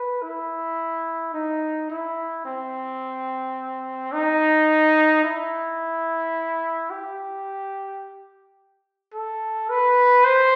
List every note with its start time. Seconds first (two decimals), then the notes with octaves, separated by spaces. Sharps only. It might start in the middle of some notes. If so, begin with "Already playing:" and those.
Already playing: B4
0.22 E4
1.34 D#4
1.90 E4
2.45 C4
4.12 D#4
5.24 E4
6.90 G4
9.13 A4
9.69 B4
10.24 C5